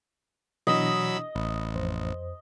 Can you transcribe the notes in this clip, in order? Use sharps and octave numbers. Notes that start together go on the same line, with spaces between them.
B2 E3 F#3 D4 D#5 B5 E6
A1 B5
F2 C5